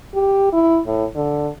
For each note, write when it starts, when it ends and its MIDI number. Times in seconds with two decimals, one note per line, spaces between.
0.14 0.48 67
0.52 0.79 64
0.86 1.05 45
1.16 1.49 50